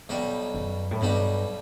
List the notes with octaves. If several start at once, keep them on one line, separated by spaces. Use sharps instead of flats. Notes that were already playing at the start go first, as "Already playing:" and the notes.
B1 B2 G3 D4
F#2
A2
B1 G2 B2 G3 D4